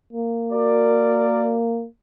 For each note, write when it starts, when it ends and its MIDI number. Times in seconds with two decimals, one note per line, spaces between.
0.13 1.86 58
0.53 1.57 66
0.53 1.57 70
0.53 1.57 74